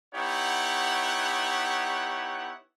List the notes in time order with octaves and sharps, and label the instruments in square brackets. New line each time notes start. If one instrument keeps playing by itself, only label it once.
[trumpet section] B3 D#4 E4 G4 C#5 F#5